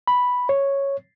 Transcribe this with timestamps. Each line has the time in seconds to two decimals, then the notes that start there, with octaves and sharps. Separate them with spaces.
0.07 B5
0.49 C#5